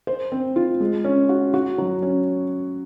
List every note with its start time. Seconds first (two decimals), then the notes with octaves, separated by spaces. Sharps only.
0.07 C5
0.32 C4
0.56 F4
0.80 G#3
1.04 C#4
1.29 F#4
1.54 F#4
1.78 F#3
2.02 C#4